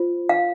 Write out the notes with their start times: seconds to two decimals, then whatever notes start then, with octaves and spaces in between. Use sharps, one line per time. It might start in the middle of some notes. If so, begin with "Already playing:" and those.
Already playing: F4 C5
0.29 F5